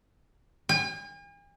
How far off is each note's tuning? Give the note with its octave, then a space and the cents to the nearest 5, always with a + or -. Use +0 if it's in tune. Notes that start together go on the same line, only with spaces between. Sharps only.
G#5 -45